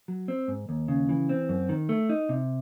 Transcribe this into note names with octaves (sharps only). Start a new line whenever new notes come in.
F#3
C4
G#2
D#2
C#3
E3
C4
F#2
D#3
A3
D#4
C3